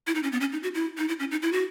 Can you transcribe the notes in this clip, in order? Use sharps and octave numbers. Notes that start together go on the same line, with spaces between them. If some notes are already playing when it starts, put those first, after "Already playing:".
E4
D#4
C#4
B3
C#4
D#4
F#4
E4
D#4
E4
C#4
D#4
E4
F#4